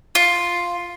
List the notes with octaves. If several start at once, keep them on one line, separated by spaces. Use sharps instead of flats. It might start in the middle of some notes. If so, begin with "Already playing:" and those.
F4